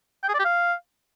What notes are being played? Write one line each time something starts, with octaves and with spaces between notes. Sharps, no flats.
G5
G#4
D5
G4
F5